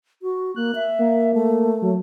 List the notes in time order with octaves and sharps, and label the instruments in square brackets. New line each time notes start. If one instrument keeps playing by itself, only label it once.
[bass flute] F#4
[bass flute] A#3 [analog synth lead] F#6
[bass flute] E5
[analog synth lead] A#3
[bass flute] A3
[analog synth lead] F#3